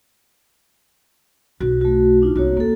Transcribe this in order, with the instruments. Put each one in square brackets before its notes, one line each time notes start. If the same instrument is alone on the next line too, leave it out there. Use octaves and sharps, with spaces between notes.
[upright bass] B1 [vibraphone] F#4
[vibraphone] A3 F#4
D4 D#4 F4
[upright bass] C2 [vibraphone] A#3 F#4 C#5
[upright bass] D2 [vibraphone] A#3 A4